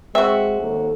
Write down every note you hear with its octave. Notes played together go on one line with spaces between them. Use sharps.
G#3 C4 F#4 E5
D#2 A4